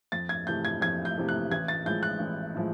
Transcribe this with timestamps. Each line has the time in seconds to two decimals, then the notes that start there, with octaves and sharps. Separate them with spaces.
0.12 F2 A6
0.29 G#6
0.47 C3 E3 A3 G6
0.65 G#6
0.81 F2 G#6
1.05 G6
1.17 C3 E3 A3
1.29 F#6
1.51 A1 G#6
1.68 A6
1.85 A2 F3 G#3 G6
2.03 F#6
2.20 A1
2.55 A2 F3 G#3